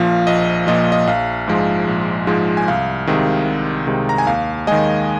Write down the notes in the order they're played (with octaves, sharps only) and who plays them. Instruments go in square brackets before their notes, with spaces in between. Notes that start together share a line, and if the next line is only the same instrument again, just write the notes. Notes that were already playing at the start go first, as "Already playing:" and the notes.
Already playing: [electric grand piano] A#1 A#2 F3 F5
A#1 D#5
A#2 F3 D#5
D#5
A#1 F5
G#2 F3 G#3
A#1
G#2 F3 G#3
G#5
C2 F5
C3 D#3 G#3
C2
C3 D#3 G#3
A#5
G#5
D#2 F5
D#3 G#3 D#5 G#5